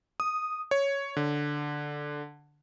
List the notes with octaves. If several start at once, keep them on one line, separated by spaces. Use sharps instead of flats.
D#6
C#5
D3